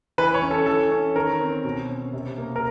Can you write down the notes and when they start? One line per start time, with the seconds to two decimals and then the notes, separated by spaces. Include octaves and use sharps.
0.18 E3 B4
0.34 C#5
0.42 C#4
0.51 A4
0.66 E3 A4
0.91 C#4
1.15 D#3 A#4
1.40 C4
1.65 B2
1.89 C#4
2.13 C3
2.37 A#3
2.56 A#4